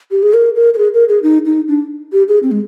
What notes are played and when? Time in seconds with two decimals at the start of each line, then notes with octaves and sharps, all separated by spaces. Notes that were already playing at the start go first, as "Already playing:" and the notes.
0.11 G4
0.23 G#4
0.34 A#4
0.55 A#4
0.74 A#4
0.78 G#4
0.94 A#4
1.09 G#4
1.23 D#4
1.45 D#4
1.68 D4
2.13 G4
2.28 G#4
2.43 C4
2.51 G#3